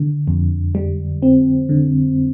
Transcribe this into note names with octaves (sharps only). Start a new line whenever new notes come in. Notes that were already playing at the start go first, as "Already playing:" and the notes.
Already playing: D3
F2
G3
C4
D3